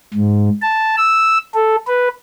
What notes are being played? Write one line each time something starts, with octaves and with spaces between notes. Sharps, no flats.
G#2
A5
E6
A4
B4